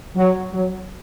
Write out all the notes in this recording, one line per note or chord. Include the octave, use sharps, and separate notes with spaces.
F#3
F#3